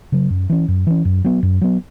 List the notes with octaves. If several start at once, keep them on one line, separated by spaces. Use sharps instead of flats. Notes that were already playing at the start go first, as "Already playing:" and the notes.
C#3 F#3
F#2
E3 C#4
F#2
E3 C#4
F#2
F#3 B3
F#2
F#3 B3